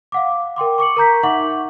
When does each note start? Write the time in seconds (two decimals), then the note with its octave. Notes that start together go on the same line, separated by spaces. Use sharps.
0.12 F5 F#5 D6
0.56 A#4 G5 C6 D6
0.78 C#6 D6 C#7 F#7
0.97 A#4 A#5 G6 B6
1.23 D#4 E5 F#5 C#6 D6 F#7